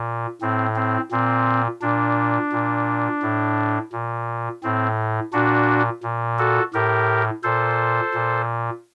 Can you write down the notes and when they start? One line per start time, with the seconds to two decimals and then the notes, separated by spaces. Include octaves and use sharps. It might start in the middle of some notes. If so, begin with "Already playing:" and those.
Already playing: A#2
0.41 A2 C4
0.76 C4
1.12 A#2 C4
1.82 A#2 D4
2.52 A#2
3.22 A2
3.93 A#2
4.63 A2 C4
5.33 A#2 D4 F#4
6.03 A#2
6.39 F#4 A4
6.74 A2 G4 A#4
7.44 A#2 A4 C5
8.14 A#2